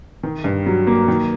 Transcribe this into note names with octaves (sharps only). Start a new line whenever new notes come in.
D#3
G2
F#3
A#3
D#3